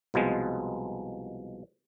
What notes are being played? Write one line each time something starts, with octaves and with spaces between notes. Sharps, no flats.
C2 B2 F3 G#3